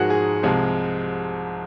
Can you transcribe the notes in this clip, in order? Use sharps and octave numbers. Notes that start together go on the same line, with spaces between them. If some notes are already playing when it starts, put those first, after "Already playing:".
Already playing: G#2 F3 G#3 F#4 G#4 A#4
G#4
C2 C3 F3 G#3